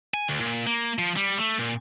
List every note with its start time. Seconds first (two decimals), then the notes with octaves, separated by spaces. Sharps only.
0.14 G#5
0.29 D2
0.40 A#2
0.67 A#3
0.99 F3
1.17 G3
1.38 A3
1.59 A#2